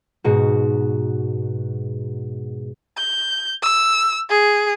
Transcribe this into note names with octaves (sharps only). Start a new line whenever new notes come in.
G#2 B2 F#4
G6
E6
G#4